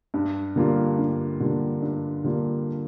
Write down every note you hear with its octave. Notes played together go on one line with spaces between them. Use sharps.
G2
D3 G3 A#3 F4
G2
D3 G3 A#3 F4
G2
D3 G3 A#3 F4